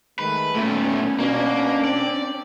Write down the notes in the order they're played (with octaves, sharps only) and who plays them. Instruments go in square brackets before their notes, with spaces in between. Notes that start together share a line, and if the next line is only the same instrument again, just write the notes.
[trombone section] D#3 G#3 A3 [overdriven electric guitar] B4
[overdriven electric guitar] A#2 G3 [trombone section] A3 [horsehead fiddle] B3 C#4
[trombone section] B2 [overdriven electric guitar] A#3 [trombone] D4
[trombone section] C4 [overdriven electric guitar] D5